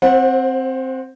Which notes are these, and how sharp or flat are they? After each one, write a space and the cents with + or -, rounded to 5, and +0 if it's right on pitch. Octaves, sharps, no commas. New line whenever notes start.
C4 +5 C5 +35 F#5 -20